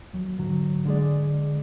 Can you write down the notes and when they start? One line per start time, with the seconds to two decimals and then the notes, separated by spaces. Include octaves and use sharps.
0.13 D#2 F#3
0.39 G#2 D3 F#3
0.86 D3 G#3 G#4 D5